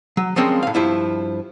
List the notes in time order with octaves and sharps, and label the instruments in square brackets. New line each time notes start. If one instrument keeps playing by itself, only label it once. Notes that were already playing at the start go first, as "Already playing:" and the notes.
[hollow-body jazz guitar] F#3
F3 G3 G#3 A#3 C4 C#4
A2 F5
G2 F3 E4